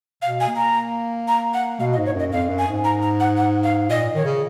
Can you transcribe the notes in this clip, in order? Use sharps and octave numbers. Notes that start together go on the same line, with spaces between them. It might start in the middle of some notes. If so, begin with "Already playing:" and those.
B2 F5
G#5
A#3
A#5
A#5
F#5
B2 F5
D#5
G#2
C#5
F#2
D#5
F2 F5
F#2
G#5
G#2
A#5
A#5
F#5
F#5
F5
A#2 D#5
D#3 C#5
C#3